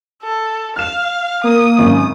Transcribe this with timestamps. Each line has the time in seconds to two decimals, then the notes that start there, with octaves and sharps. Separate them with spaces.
0.22 A4
0.76 F5 F6 E7
1.44 A#3 D#6
1.78 G#1 F#2